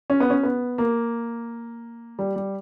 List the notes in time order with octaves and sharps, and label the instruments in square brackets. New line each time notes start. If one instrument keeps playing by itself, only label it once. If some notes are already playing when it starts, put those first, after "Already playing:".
[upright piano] C#4
B3
C#4
B3
A#3
G3
G3